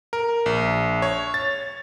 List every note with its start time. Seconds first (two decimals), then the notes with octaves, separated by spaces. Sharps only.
0.13 A#4
0.46 A#1
1.02 C#5
1.34 A6